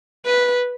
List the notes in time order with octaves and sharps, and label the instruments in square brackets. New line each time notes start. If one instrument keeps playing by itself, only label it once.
[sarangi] B4